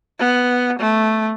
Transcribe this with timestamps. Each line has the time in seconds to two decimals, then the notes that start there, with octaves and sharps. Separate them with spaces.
0.19 B3
0.80 A3